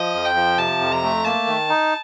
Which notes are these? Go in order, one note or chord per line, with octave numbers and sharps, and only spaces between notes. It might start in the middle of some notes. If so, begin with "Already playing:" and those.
Already playing: F3 D#5
F2
G5
F3
C3 A5
F2
A#5
A3
A#3 A5
D#3
D#4